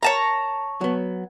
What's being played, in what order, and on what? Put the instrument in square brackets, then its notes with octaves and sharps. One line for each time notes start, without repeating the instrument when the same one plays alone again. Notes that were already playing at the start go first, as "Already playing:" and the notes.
[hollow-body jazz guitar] A#4 [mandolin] C#5 A5 A#5
[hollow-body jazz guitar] F#3 B3